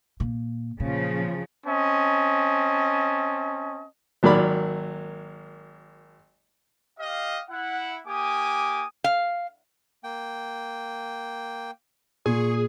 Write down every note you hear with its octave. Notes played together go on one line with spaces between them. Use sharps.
A#2
A#2 C#3 F3
C4 C#4 D#5 A5
G#1 F#3 A#3 D5 B5
G4 D#5 F5
E4 F#5
A#3 G4 G#5 D6 D#6
F5
A#3 G5
A#2 G#4 C#6